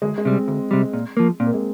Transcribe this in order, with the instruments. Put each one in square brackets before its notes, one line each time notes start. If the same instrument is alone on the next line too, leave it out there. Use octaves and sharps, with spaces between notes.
[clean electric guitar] D2 [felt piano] G#3
[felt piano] G#3
[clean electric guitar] C3 G3
[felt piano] C4
[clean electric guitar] D2
C3 G3
A#2
F3 A#3
[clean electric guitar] A#2 [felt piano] C4
[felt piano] A#3
G#3